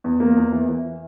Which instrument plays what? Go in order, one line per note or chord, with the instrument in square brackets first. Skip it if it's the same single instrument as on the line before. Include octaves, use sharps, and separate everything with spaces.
[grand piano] E2
A#3
E2
E3
E3